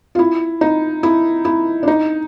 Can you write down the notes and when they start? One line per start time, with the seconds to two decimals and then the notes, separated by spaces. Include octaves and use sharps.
0.15 F4
0.19 E4
0.61 D#4
1.03 E4
1.45 E4
1.83 D4
1.88 D#4